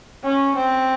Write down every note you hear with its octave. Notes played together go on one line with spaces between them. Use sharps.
C#4
C4